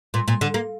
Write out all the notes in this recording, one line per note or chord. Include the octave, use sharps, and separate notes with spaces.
A#2
A#2
D3
A#3